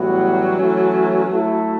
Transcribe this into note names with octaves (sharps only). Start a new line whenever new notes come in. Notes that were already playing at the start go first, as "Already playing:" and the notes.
Already playing: A2 E3 F#3 G3 B3 F#4
E3 A3 C#4
A3 E4 A4